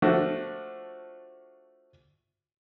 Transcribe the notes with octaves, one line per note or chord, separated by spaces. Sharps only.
F3 A3 D4 F#4